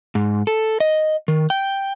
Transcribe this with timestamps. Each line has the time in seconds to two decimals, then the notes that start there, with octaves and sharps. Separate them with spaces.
0.15 G#2
0.47 A4
0.80 D#5
1.28 D#3
1.50 G5